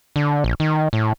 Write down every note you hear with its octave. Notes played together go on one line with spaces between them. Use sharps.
D3
A#1
D#3
A2